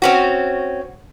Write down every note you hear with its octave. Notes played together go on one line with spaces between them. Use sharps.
C4 C#4 F#4